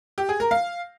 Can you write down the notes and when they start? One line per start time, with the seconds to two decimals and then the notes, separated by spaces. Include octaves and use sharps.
0.18 G4
0.29 G#4
0.40 A#4
0.51 F5